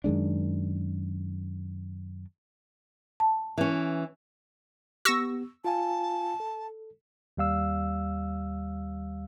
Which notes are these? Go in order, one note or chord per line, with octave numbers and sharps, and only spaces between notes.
F#2 D#3 G#3 D4
A5
E3 C#4
B3 G4 C#6 E6 A#6
F4 F5 G#5 A5
A4
D#2 G3 F5 E6